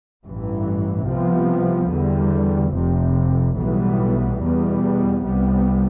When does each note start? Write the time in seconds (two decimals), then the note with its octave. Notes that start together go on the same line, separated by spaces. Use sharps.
0.25 A1 G2 E3
1.07 C2 C3 F3 B3
1.91 E2 D3 G3
2.74 F1 F2 C3
3.56 B1 A2 E3 G3 B3
4.40 E2 B2 G3 B3
5.23 C2 C3 G3 B3